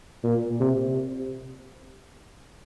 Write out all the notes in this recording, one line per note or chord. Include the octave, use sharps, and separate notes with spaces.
A#2
C3